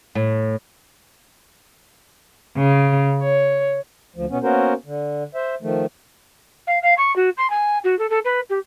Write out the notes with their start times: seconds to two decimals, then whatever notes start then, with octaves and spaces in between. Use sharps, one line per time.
0.15 A2
2.57 C#3
3.21 C#5
4.16 D2 F3
4.30 B2 B3 C#4
4.43 A#3 B3 C#4 F#4 A#4 C5
4.86 D3
5.35 C5 E5
5.62 D#3 F3 A3
6.67 F5
6.82 F5
6.97 C#6
7.16 F#4
7.37 C6
7.50 G#5
7.84 F#4
7.98 A4
8.10 A4
8.24 B4
8.49 G4